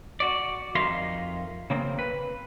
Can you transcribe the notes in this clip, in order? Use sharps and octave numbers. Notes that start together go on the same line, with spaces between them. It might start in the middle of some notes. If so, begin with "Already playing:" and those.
F#4 D5
F2 D#4 A#4 E5 F5 C6
C#3 A#3 C4
B4